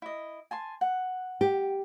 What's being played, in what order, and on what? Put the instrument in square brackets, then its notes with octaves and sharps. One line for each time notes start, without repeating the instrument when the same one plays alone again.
[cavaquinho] E4 D#5
G#5 A5 C6
F#5
[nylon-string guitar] G4